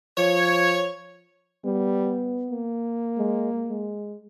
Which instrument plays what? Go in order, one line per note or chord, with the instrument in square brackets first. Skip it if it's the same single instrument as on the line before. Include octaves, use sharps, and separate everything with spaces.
[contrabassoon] F3 [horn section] C#5
[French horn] G3 [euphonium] B3
[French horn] A#3
[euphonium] G#3
G#3